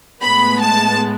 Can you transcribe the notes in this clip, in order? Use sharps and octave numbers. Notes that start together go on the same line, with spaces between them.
A2 G#3 B3 B5
A5